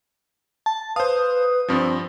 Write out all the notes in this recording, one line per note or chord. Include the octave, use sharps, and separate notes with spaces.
A5
B4 C5 F5 D#6
G2 F3 C4